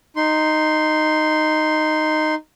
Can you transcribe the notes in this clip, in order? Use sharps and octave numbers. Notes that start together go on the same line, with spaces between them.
D#4 C6